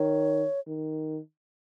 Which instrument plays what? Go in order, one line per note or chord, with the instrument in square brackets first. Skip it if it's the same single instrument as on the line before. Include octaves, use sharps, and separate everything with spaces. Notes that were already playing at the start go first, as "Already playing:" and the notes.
Already playing: [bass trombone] D#3 [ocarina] C#5
[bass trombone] D#3